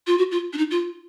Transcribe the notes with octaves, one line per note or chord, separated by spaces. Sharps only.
F4
F#4
F4
D4
D#4
F4